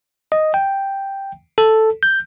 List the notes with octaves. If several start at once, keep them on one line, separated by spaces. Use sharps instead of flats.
D#5
G5
A4
G6